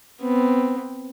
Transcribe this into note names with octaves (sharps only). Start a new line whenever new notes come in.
B3 C4